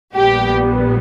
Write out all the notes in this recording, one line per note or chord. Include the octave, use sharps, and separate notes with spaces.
A#1 A#2 G3 B3 G4